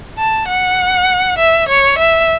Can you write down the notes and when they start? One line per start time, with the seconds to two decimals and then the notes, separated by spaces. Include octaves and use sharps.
0.18 A5
0.48 F#5
1.38 E5
1.68 C#5
1.98 E5